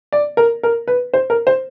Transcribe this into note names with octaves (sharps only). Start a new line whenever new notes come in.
D5
A#4
A#4
B4
C5
A#4
C5